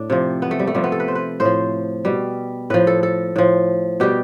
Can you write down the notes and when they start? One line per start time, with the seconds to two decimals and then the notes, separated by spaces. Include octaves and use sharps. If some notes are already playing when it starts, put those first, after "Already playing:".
Already playing: A2 D4
0.10 C3 F3
0.42 B3
0.51 A3
0.59 G3
0.67 A3
0.75 C3 F3 G3
0.84 B3
0.92 A4
1.00 B4
1.08 C5
1.15 B4
1.40 A2 C5
1.45 F3
2.05 B2 G3
2.70 A2 F3 B4
2.87 A4
3.03 A4
3.36 A2 F3
4.00 B2 G3 G4